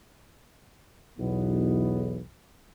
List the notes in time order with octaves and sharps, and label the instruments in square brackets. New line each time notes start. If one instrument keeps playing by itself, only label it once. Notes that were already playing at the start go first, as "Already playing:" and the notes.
[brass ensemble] B1 E2 B3